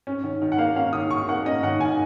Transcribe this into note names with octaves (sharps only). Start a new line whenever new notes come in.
C#4
D#3
D#3
F#5
A#3 F5
C#4 F5
D#3 D#6
D#3 C#6
A#3 F#5
C#4 D#5
D#3 F#5
D#3 G#5